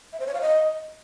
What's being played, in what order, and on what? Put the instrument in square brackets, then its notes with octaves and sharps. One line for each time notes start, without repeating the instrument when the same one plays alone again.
[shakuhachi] E5
C5
C#5
F5
D#5